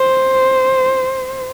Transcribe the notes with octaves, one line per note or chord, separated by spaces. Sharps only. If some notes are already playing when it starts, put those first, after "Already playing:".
Already playing: C5